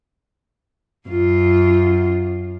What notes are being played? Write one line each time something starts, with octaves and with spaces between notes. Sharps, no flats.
F#2 F4